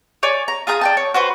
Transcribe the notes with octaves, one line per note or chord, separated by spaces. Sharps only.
C#5 D5 G#5
A#5
F4 G#4 A#5 D#6
D5 G5 A5
C#5
F#4 B4 C5